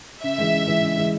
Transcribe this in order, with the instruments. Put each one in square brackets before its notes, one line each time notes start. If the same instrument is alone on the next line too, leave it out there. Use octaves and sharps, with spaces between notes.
[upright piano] C#3 [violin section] E5
[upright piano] E3 G#3
C#3
E3 G#3
C#3
E3 G#3